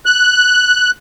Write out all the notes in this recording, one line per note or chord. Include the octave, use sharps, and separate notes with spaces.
F#6